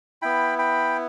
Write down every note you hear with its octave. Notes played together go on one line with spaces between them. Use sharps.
B3 E4 G5 B5
G5 B5